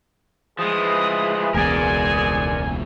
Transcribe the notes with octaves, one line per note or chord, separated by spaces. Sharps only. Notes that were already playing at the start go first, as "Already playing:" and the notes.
F3 G#3 E4 G#4 B4 D#6
E1 C#2 B3 G#4 A#4 D5 G#5